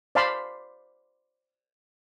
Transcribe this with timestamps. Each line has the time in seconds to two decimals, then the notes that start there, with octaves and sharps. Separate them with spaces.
0.15 C5 D5 F5 A5 B5 C6